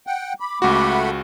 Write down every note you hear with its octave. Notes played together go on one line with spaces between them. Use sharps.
F#5 G5
B5 D6
C#2 A3 F#4 F#5 B5